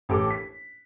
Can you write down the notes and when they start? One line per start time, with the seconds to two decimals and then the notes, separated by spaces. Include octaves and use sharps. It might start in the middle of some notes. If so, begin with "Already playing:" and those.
0.09 A1 G4 A4 D6
0.31 B6